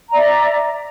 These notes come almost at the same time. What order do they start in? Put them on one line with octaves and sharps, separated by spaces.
A#5 D5 E5